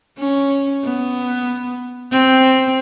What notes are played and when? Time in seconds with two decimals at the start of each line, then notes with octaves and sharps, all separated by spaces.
0.19 C#4
0.85 B3
2.12 C4